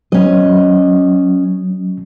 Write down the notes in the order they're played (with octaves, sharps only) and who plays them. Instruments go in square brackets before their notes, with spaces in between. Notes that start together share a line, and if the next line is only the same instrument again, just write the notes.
[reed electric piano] F#3 [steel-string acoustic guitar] C#4 D#5